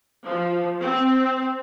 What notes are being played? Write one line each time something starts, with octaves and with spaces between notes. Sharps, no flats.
F3
C4